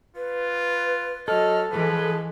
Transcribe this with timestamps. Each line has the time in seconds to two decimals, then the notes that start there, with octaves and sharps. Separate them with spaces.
0.16 F4 B4
1.28 F#3 A4 D#5 F6
1.72 E3 F3 G#3 G#4 B4